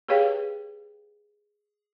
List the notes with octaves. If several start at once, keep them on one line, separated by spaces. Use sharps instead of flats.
G4 G#4 B4 C#5 F5 G5